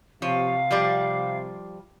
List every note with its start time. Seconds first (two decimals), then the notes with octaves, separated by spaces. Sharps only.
0.22 C3 F3 C#5 F5
0.71 F3 G3 D5